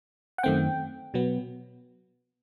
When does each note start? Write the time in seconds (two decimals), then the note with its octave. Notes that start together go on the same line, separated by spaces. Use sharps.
0.38 F#5
0.43 F#2 D#3 A3 C4 G5
1.14 B2 F#3 B3